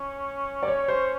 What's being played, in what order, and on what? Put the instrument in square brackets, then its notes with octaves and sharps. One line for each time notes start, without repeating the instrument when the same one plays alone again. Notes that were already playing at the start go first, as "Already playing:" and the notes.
Already playing: [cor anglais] C#4
[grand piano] D5
C#5
C5